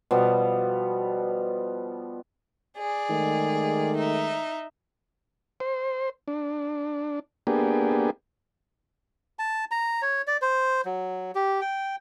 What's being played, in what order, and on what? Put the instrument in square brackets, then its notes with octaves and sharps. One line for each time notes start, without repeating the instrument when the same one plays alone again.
[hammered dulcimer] B2 F3 G3 B3
[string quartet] G#4 D5
[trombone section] D#3 G#3 A3
[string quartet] D#4 E5
[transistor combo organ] C5
D4
A#3 B3 D4 G4 G#4
[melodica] A5
A#5
C#5
D5
C5
F#3
G4
G5